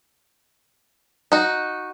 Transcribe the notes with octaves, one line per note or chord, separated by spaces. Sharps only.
D#4 F#4